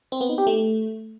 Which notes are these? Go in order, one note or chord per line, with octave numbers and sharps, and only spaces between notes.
C4
B3
D#4
G4
A3